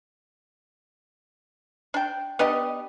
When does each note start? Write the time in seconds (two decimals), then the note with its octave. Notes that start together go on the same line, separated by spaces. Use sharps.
1.94 D4 G5
2.39 B3 D4 G4 D#5